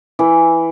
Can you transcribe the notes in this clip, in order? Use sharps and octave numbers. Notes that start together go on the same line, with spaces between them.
E3